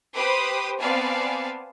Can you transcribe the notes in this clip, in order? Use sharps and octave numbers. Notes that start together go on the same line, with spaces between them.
G4 B4 C5 B5 D6 D#6
B3 C4 D5 F5 G#5 A5